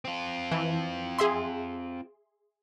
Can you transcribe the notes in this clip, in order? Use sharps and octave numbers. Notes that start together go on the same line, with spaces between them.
C4 F4
E3
G#4 E5 C6